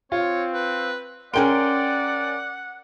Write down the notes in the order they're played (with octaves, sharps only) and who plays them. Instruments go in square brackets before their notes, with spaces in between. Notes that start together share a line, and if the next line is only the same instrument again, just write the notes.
[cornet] C4 [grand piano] F4 [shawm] C#5
[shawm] B4
[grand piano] C#4 A#4 D7 [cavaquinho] G#4 G5 C6 [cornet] D5 [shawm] F#5